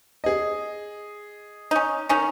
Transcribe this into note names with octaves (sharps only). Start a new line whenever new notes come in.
G#4 D#5
C#4 D#4
D#3 C#4 D#4